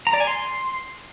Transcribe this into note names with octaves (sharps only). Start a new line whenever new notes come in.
A#5
D5
G#5
C6